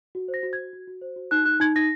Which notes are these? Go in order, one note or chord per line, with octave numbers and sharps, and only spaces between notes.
F#4
C5
A#6
F#4
G#6
F#4
F#4
F#4
C5
F#4
D#4 F#6
D#4 F#6
D#4 G#6
D#4 A#6